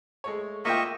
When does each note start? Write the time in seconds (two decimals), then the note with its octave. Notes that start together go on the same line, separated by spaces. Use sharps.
0.24 G#3 A3 C#5
0.65 A#3 F4 D#5 E5 G5 C#6